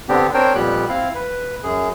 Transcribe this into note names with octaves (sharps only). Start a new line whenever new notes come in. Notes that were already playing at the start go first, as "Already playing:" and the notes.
D3 B3 C4 D4 G4
C4 D4 A#4 C5 C#5 G5
F2 A#2 G3 B3 G4 F#6
C4 E4 F5
B4
F#2 G#4